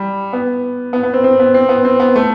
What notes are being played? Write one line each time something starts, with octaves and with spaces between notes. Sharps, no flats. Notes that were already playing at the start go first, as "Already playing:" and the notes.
Already playing: G3
B3
B3
B3
C4
C4
B3
C4
B3
C4
B3
A3